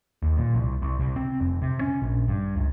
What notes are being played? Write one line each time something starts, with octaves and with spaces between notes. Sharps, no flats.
D#2
A#2
C2
C2
C2
C4
F1
C3
C#4
A#1
G2
C#2